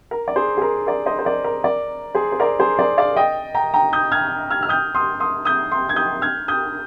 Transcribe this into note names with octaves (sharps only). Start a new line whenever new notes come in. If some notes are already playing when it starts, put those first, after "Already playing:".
A#4
D5
G#4 C5
G#4
A#4
A#4 D5
C5 D#5
C5
A#4 D5
A#4
A#4 D5
G#4 C5
C5
A#4 D5
G#4 C5
A#4 D5
D5 F5
D#5 G5
G5 A#5
G5 A#5
D#6 G6
F6 G#6
F6 G#6
F6
D#6 G6
C6 D#6
C6 D#6
D#6 G6
C6 D#6
G#6
D#6 G6
F6 G#6
D#6 G6